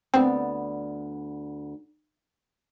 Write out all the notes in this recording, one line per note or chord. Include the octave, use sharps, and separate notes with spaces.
D2 B3 C4 D5